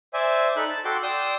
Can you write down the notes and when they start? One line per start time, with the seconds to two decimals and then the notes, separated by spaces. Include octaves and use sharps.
0.14 C5 D5 E5 G#5
0.57 D#4 A4 B5 F#6
0.69 A5
0.85 F#4 A4 G5 C6 D6
1.03 D5 G5 C6 D#6 E6